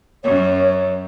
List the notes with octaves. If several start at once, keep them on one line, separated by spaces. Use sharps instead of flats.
F#2 C#5